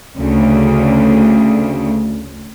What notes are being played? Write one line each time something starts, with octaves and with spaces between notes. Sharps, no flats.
D2 C#3